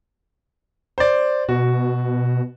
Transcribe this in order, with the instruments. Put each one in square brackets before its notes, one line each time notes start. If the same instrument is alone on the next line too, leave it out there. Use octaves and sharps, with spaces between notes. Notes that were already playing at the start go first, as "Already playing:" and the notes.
[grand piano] C5 D5
[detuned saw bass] B2 [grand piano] F#4